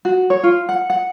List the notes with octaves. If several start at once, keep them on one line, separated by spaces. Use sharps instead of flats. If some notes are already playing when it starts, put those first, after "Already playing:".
F#4
C#5
F4
F#5
F#5